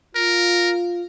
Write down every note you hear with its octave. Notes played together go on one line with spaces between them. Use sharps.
F4 A#4